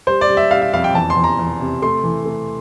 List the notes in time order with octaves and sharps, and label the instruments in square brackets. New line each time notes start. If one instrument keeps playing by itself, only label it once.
[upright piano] G3 C5
D5
G3
E5
G3 F5
E5
F2 F5
G5
E2 A5
C6
E2
A#5
E2
C3
A3 C6
E3
A3